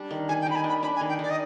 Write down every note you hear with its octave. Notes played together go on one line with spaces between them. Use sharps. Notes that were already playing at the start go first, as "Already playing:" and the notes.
Already playing: G3 D4
D#3
D#3 G#5
G5
D#3 B5
G#5
D4
B5
D4 B5
G#5
D#3
G5
D#3 D5
D#5